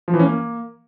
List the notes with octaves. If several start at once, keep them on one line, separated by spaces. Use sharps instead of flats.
F3
E3
C#4
A#3